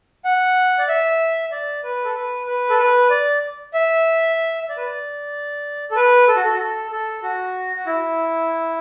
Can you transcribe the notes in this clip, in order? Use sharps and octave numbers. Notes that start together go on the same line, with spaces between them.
F#5
D5
E5
D5
B4
A4
B4
B4
A4
B4
D5
E5
D5
B4
D5
A4
B4
A4
F#4
A4
F#4
A4
A4
F#4
F#4
E4